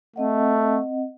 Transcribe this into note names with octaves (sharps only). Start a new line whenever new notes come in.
A3 C4 D#5 F#5